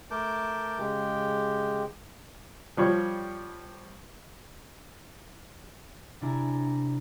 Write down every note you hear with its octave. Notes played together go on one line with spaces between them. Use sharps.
A3 A#4 A5 D6 G6
C#3 G#3 G4 G5
F3 G3 C#5
C3 D4 E4 A#4 G#5 A#5